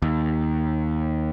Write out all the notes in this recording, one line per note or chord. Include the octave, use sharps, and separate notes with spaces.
D#2